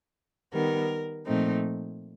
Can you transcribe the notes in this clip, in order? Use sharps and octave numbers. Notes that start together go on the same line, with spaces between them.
D#3 G3 B3 A#4
A#2 F3 A3 C4 D#4